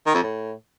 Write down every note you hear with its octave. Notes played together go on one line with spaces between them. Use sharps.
D#3
F2
A2